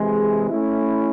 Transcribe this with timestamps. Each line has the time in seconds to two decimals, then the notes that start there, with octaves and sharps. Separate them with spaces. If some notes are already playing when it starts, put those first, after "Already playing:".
Already playing: C3 E3 G#3
0.50 A3 C#4 E4